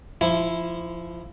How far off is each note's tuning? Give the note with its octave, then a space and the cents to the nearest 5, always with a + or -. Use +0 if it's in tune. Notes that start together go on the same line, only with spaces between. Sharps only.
F3 -20 E4 +0